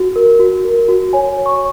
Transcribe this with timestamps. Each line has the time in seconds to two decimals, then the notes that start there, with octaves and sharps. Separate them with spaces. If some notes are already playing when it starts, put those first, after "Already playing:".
Already playing: F#4
0.16 A#4
0.39 F#4
0.65 A#4
0.89 F#4
1.13 C#5 G#5
1.37 C#5
1.46 C#6